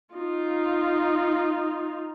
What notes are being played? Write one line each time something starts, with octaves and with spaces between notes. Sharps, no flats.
D#4 F4